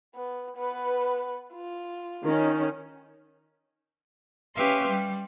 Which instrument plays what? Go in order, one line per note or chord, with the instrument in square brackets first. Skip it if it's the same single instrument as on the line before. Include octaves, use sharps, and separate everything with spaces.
[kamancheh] B3
B3 B4
F4
[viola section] D#3 C#4
[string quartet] C#4 G4 B4 E5 F5 C6
G3